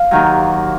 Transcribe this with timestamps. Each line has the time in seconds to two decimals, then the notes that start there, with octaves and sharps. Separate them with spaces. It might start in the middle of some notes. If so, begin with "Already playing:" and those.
Already playing: F5
0.11 D#2 D#3 F#3